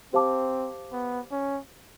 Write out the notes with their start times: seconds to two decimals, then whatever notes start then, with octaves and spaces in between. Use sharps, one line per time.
0.13 C4 G4 C5 F5 A5 D6
0.92 B3
1.31 C#4